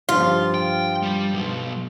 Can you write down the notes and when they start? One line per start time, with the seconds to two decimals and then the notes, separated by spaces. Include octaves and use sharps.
0.09 G2 F3 F4
0.54 G5
1.03 G3
1.33 B2 F#3